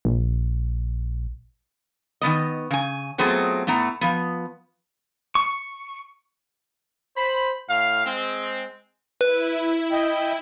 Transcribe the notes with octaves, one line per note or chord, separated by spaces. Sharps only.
A#1
D#3 F3 B3 D#5
C#3 G#5
F#3 A3 B3 C4 F4 G#4
A2 A3 B3 A#5
F3 B3
C#6
C5 B5
A2 F5
G#3 C4
E4 B4
D#5 G5